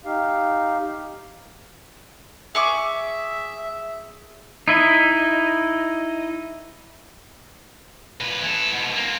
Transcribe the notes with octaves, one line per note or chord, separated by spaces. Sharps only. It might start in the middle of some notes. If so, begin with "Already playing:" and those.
D#4 G4 F5
G#4 E5 C#6 D6
D#4 E4 D#5
A#2 B4
E3 A4
G#2 B2
A#3 C4